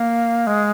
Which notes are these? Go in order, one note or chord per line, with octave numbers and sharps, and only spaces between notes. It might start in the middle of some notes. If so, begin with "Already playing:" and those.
Already playing: A#3
G#3